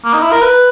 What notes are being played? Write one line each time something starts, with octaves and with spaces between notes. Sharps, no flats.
A#3
D#4
E4
A#4
B4